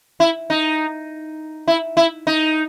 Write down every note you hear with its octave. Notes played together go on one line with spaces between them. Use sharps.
E4
D#4
E4
E4
D#4